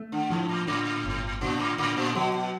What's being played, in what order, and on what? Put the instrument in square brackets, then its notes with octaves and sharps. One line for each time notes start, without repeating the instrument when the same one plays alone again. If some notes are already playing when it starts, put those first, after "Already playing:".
Already playing: [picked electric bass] A3
[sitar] D3
[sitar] G#2 [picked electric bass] F3
[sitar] A2
[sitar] A2 [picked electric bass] D3
[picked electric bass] G1
[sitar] A#2 [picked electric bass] D3
[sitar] A2
[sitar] A2 [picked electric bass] D3
[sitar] A#2
[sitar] B2 [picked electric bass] F#3
[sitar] B2